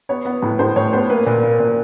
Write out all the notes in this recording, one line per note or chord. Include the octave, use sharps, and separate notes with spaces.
B3 C#5
B3
A2
A2 C5
A2 C#5
B3 C5
A#3 B4
A#2
A#3
A#2